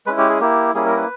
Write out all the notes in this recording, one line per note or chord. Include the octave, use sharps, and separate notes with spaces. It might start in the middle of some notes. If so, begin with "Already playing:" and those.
G#3 C#4 E4 B4
G4
G#4
A#3 E4 G4
G3 A#3 C#4 E4 G#4
A#4
B4